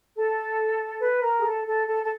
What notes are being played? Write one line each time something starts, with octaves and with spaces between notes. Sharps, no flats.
A4
B4
A#4
G#4
A4
A4
A4
A4